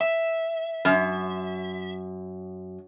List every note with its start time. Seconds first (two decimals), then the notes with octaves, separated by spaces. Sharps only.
0.01 E5
0.85 F#2